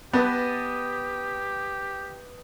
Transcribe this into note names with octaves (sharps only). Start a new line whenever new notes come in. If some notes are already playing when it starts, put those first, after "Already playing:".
B3 G4 B4 D#5 A5